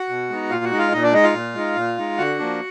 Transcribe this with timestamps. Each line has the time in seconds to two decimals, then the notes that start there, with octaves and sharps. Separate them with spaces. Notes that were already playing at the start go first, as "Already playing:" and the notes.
Already playing: F#4 F#5
0.09 B2
0.30 G#3 B3 D#4
0.50 A#2 F4 F5
0.64 F#4 F#5
0.71 G#3 D#4
0.78 F4 F5
0.92 A#2 D#4 D#5
1.03 D4 D5
1.13 G#3 D#4 D#5
1.23 F4 F5
1.34 A#2
1.55 G#3 D#4
1.76 A#2
1.98 G#3 D#4
2.18 D3 F#4 F#5
2.39 F3 A#3 D4